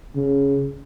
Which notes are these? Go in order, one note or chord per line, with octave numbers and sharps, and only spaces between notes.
C#3